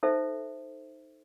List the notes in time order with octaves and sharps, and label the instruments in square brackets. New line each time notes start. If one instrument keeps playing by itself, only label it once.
[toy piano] D#4 A4 C5 E5